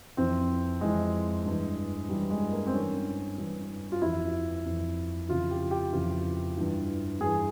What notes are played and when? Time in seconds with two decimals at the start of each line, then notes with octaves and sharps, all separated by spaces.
0.17 F2 E3 C4
0.81 F2 E3 G#3
1.45 G2 E3
2.09 G2 E3 G3
2.31 G#3
2.52 A#3
2.67 C4
2.73 G2 E3 C#4
3.38 G2 E3
3.92 F4
4.02 F2 E3 E4
4.65 F2 E3
5.29 F2 C#3 E3 F4
5.51 G4
5.71 G4
5.93 F2 C#3 E3 F4
6.57 G2 E3
7.21 G2 E3 G#4